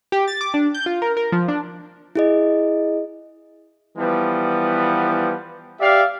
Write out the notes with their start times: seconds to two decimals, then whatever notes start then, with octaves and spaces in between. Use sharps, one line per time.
0.12 G4
0.28 A6
0.41 D6
0.54 D4
0.75 G6
0.86 F4
1.02 A#4
1.17 A#4
1.32 F3
1.48 D4
2.15 E4 G#4 D#5
3.98 E3 F3 G3 B3
5.80 G4 D5 E5 F5